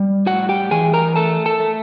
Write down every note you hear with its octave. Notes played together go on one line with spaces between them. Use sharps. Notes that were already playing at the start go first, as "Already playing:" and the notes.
Already playing: G3
A2 F#4 F#5
G4 G5
E3 G#4 G#5
A#4 A#5
A3 A4 A5
A4 A5
A3